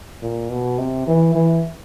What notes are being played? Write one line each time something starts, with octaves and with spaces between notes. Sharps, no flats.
A#2
B2
C3
E3
E3